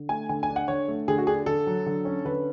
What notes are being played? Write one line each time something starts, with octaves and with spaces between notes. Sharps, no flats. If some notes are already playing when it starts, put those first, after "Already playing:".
Already playing: D3
A3 G#5
D3 G#5
G#5
D4
F#5
D3 C#5
A3
D3 G#4
F#4
D4 G#4
D3 A4
F#3
D3
C#4
D3 B4